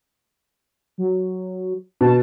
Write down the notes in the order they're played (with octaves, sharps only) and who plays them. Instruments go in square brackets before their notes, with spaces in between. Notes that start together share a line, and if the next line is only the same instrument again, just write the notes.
[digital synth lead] F#3
[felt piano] B2 [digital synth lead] A5